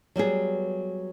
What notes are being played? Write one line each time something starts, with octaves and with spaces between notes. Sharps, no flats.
F#3 G3 B3 G#4